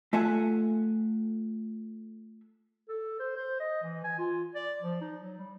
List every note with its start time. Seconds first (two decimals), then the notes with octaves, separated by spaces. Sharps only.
0.13 A3 F4 A4 E5 F#5 G#5
2.89 A4
3.20 C5
3.37 C5
3.60 D#5
3.83 E3
4.04 G#5
4.18 F4
4.55 D5
4.82 F3
5.01 D#4
5.21 F#3
5.38 G3